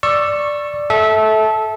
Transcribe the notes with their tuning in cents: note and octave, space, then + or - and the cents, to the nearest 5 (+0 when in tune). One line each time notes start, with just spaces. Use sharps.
D5 +0 C#6 -15 E6 +20
A4 -15 E5 -20